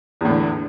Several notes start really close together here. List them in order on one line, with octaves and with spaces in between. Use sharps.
E2 A2 D3